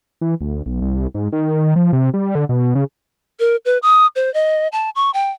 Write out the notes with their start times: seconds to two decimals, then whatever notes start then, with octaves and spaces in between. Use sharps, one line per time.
0.21 E3
0.41 D2
0.66 B1
0.81 C2
1.14 G#2
1.32 D#3
1.76 F3
1.93 C3
2.14 G3
2.35 D3
2.49 B2
2.75 C#3
3.40 A#4
3.65 B4
3.82 D#6
4.16 C5
4.34 D#5
4.72 A5
4.96 C#6
5.14 G5